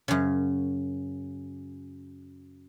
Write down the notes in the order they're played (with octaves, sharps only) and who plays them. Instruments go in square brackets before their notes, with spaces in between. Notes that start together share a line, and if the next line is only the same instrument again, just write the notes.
[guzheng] F#2 C#3